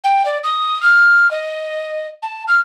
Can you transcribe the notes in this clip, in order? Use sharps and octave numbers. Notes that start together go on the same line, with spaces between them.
G5
D5
D#6
F6
D#5
A5
F6